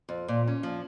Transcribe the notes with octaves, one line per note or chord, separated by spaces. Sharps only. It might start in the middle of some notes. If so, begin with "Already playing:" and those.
F2
A#2
C#4
F3